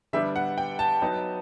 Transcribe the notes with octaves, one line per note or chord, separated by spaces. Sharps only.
D3 G3 B3 D4 E5
F#5
G5
A5
F#3 B3 D#4